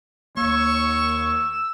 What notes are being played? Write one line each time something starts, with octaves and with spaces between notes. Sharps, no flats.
D#2 A#3 C#5 C#6 E6